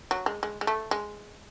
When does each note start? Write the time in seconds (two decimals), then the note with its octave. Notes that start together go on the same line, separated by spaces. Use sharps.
0.11 F#3
0.26 G#3
0.43 G#3
0.61 G#3
0.67 A3
0.91 G#3